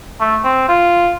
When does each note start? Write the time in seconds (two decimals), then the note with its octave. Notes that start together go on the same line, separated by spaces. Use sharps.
0.21 A3
0.44 C4
0.68 F4